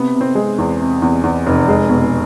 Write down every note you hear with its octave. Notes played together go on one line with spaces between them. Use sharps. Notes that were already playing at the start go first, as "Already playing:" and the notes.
Already playing: C3 B3
C3
C4
G#3
E2
C3
E2
E2
F1
G#3
B2